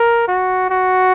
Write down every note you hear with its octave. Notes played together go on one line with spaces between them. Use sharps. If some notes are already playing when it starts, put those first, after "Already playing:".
Already playing: A#4
F#4
F#4